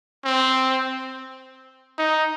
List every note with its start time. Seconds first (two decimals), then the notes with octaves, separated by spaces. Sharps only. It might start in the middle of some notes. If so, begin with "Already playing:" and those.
0.25 C4
1.98 D#4